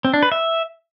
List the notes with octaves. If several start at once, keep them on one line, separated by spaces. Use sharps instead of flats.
C4
D4
B4
E5